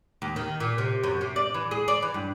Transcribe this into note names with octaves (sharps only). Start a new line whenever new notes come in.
D#2
D#3
A#2
C3
F#2
C3
D5
E3
G#4
D5
E3
G2